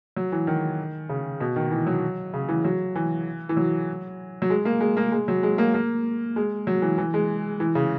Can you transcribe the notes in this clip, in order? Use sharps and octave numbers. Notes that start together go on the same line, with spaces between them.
F#3
E3
D#3
C#3
B2
D#3
E3
F#3
C#3
E3
F#3
E3
E3
F#3
F#3
G#3
A#3
G#3
A#3
G#3
F#3
G#3
A#3
A#3
G#3
F#3
E3
E3
G#3
E3
C#3